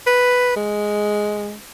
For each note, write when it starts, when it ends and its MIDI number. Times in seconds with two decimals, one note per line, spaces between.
0.07 0.54 71
0.56 1.55 56